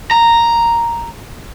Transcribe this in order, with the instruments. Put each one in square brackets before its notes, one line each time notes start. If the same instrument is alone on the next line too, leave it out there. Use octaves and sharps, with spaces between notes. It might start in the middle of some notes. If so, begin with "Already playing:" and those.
[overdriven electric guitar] A#5